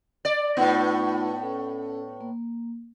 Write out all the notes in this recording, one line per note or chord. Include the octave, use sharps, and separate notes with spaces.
D5
A2 A3 B3 D#4 F4
C#4 A4
A#3